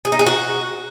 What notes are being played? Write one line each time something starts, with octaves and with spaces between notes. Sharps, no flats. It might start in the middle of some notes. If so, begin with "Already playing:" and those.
G#4
D#4
G#4
F#4